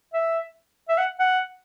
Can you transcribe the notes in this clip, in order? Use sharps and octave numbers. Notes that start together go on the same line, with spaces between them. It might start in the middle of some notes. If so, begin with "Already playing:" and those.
E5
E5
F#5
F#5